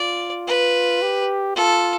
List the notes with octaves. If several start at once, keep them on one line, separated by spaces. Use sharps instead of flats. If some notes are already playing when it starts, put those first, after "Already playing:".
Already playing: F4 D5
B4
G4
F4 A4